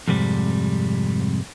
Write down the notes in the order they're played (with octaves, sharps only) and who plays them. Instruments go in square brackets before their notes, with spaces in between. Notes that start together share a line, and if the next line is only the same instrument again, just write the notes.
[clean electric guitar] F2 G#2 C3 G3